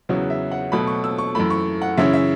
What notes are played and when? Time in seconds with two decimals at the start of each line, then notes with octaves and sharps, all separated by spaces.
0.09 E2 C#3 F#3 B3 E4 C#5
0.30 E5
0.51 F#5
0.72 B2 F#3 A3 B5
0.87 C#6
1.04 E6
1.18 C#6
1.35 F#2 E3 A3 B5
1.50 C#6
1.82 F#5
1.97 F#2 C#3 E3 C#4 E5
2.13 E5